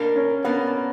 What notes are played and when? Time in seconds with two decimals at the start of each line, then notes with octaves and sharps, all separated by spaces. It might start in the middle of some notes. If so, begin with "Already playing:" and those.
Already playing: B2 A#3 D4 A#4
0.16 C#4
0.44 B2 A#3 B3 D4 A#4